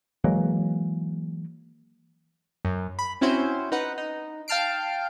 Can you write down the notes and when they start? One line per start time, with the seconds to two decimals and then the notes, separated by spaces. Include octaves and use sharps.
0.24 E3 F#3 G#3 A#3
2.65 F#2
2.99 B5
3.21 C4 C#4 E4 F#4 C5
3.72 D#4 B4 F#5
3.98 D#4
4.48 F5 G5 A5 F6 C7 D7